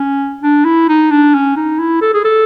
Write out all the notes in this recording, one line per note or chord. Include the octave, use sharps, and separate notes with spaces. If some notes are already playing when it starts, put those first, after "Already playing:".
Already playing: C#4
D4
E4
D#4
D4
C#4
D#4
E4
A4
G#4
A4